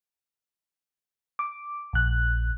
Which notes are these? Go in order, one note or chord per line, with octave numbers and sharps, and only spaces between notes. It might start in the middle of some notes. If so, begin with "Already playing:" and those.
D6
A#1 F#6